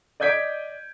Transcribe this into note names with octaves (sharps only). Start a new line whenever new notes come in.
D5 D#5 G6 G#6 B6 D7